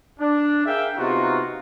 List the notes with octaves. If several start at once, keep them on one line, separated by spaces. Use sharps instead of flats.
D4
G#4 A#4 E5 F5 G5
C3 B3 D#4 F4 F#4